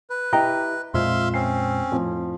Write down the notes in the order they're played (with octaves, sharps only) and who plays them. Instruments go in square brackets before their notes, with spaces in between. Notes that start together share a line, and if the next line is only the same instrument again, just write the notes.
[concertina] B4
[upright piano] E4 G4 [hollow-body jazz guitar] D#5 G5 A#5
[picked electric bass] F2 A#2 G#3 [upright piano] C4 F4 [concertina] E5 F5 C6
[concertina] C4 C#4 [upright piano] C7
[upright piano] F2 A2 F3